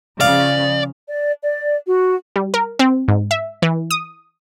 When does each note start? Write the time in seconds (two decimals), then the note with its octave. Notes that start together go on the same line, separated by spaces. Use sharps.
0.21 C#3 F3 D5 F5
1.09 D5
1.41 D5
1.87 F#4
2.36 G3
2.54 A#4
2.79 C4
3.08 G#2
3.31 E5
3.62 E3
3.91 D#6